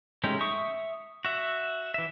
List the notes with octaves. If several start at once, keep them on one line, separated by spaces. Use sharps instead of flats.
G#3 A3 C#4 D#4 G4
E5 C#6 D#6
F#4 E5
E3 E5